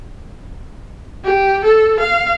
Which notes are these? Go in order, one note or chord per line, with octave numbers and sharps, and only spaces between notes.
G4
A4
F5